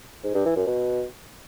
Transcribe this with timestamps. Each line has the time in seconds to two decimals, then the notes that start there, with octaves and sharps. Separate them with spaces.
0.24 G#2
0.35 G2
0.45 E3
0.56 F#2
0.67 B2